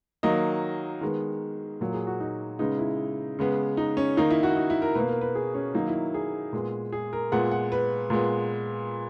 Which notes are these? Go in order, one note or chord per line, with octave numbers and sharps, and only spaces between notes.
D#3 F#3 A#3 D#5
D#3 G#3 B3
A#2 F#3 A#3
G#4
F#4
D#4
C#3 G#3 B3 D#4
E4
C#3 G#3 B3
D#4
C#4
D#3 A#3 D#4
E4
F#4
D#4
E4
A#4
B2 A#3 B4
A#4
B4
G#4
C#4
D#3 F#3 A#3 D#4
E4
G#4
A#2 G#3 B3
G#4
A#4
A#2 G#3 B3 F#5
F#5
B4
A#2 G#3 B3